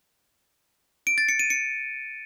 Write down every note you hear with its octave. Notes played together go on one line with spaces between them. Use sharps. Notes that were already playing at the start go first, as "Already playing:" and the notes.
D7
A6
C#7
D#7
C#7